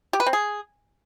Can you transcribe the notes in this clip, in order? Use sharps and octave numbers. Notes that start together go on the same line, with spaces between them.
G4
B4
C4
G#4